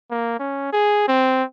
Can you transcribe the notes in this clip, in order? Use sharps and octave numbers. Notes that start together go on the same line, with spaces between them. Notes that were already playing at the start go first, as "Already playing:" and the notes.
A#3
C#4
G#4
C4